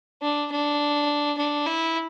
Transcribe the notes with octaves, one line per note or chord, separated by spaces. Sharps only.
D4
D4
D4
E4